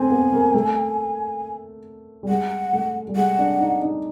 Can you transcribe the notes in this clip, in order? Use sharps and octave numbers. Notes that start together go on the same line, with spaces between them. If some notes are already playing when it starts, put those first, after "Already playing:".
Already playing: A3 C4 G#5
B3
A#3
A3
G3
G#3 F#5
A3
G3
G#3 F#5
D4
D#4
D#4